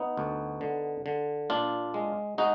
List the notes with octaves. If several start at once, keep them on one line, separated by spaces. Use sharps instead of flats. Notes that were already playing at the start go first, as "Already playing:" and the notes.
Already playing: B3 D#4
D2
D3
D3
A#2 D4 F4
G#3
G#3 D#4 F#4